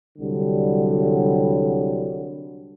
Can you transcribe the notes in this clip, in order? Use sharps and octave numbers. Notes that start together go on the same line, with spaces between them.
C2 D3 F#3 G3